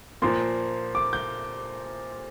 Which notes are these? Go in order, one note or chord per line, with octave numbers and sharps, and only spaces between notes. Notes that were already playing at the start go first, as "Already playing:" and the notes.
A#2 F3 A#3 C6
D6
G6